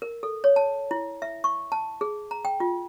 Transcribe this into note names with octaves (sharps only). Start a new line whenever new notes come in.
A#4
A4
C#5
A5
E4
E5
C#6
A5
G#4
A#5
G5
F4